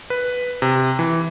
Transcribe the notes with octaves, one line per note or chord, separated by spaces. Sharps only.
B4
C3
E3